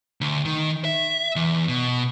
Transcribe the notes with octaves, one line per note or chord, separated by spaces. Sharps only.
D2
D#3
E5
E2
B2